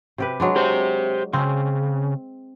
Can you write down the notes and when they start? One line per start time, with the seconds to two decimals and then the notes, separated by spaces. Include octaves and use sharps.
0.18 C3 G4 B4
0.40 F#3 G#3 D4
0.56 G4 C5
1.33 C#3 C4